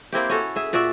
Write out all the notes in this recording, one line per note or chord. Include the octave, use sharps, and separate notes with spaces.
A#3 C4 E4 G4
C#4 F#4 A4
G#4 E5
A#2 F#4 D5 E5